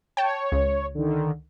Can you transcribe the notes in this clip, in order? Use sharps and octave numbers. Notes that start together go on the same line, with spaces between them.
C#5 G5 A5
C#2
D3 D#3